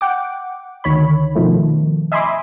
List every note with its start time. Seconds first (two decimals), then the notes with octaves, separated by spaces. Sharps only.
0.01 F#5 G5 D6
0.84 D2 D#3 C#5 B5
1.35 B2 D#3 F3 A3
2.12 D#5 E5 G#5 B5 C6 D6